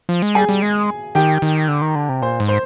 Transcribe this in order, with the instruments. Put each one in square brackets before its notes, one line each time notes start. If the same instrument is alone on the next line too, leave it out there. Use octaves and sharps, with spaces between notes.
[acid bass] F3
G#3
[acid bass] G3 [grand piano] G#4 G#5
[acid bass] G3
G#3
[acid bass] D#3 [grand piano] G4 G5
[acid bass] D#3
D3
D#3
D3
C3
[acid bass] A#2 [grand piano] C5 C6
[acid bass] G#2
[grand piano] C5 C6